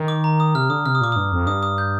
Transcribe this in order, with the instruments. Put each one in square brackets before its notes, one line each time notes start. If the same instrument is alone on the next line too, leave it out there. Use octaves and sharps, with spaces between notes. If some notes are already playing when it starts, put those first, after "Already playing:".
Already playing: [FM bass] D#3
[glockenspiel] D6
A#5
D#6
[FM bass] C3 [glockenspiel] F6
[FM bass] D3 [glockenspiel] D#6
[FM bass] C3 [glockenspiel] F6
[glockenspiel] D#6
[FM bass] A#2 [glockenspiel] D6
[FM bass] G2 [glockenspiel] D#6
[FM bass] F2
[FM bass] G2 [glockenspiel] D#6
[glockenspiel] D#6
G6